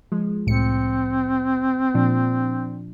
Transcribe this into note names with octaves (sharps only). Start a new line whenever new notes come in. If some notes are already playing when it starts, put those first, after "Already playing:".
F3 G#3
C2 A2 C4 C#7
A#2 F3 D4